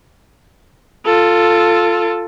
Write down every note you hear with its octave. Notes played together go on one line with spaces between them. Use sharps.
F4 A4